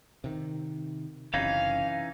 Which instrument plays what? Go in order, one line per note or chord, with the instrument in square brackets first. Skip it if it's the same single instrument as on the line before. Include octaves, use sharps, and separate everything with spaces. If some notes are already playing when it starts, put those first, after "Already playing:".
[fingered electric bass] C3 D#3
[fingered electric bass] F#1 C3 [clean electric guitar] E3 C#4 D#4 [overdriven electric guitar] F5